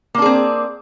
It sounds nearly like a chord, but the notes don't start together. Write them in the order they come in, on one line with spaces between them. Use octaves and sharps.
A#3 D4 G#4 C4